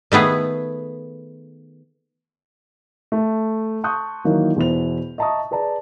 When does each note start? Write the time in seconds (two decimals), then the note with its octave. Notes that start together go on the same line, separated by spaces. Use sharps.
0.12 D#3 A3 B3 G#4
3.12 A3 A4
3.84 A5 C6 C#6 D#6 F#6 G6
4.25 D#3 E3 F#3 A#3 D#4 E4
4.56 E2 B2 E4 C5 F7
5.18 D#5 E5 A5 A#5 C#6 D#6
5.51 G#4 B4 D5 A5 A#5